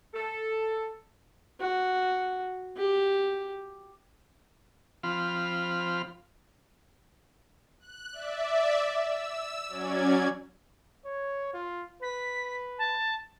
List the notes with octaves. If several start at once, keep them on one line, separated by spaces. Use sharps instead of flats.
A4
F#4
G4
F3 C4 F4 B5 F6
F#6
D5 E5
E6
F#3 C#4 D5 G#6
C#5
F4
B4 B6
A5